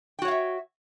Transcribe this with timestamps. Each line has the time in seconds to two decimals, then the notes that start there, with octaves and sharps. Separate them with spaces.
0.19 G5
0.22 F#4
0.25 C#5
0.28 F5
0.31 E5